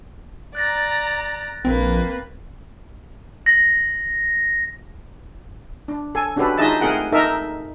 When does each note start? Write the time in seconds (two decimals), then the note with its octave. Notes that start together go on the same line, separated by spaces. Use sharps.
0.55 D5 A#5 F#6 A6 A#6
1.65 A#1 A#3 C4 B4
3.46 A#6
5.88 D4
6.15 A4 G#5
6.36 C#4 D4 F#4 G4 A4 B4
6.58 D#4 F4 G#4 D#5 E5 A5
6.80 A3 C4 G#4 A#4 F#5 G5
7.12 D#4 A4 A#4 D#5 E5